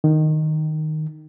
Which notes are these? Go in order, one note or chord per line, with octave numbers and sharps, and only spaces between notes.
D#3